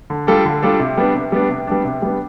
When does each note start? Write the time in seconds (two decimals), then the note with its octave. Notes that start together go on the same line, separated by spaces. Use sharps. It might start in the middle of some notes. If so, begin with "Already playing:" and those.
0.10 D3
0.27 G3 D4 F4 A4
0.45 D3
0.62 G3 D4 F4 A4
0.80 C3
0.98 G3 B3 D4
1.15 C3
1.32 G3 B3 D4
1.50 C3
1.67 G3 B3 D4
1.85 C3
2.02 G3 B3 D4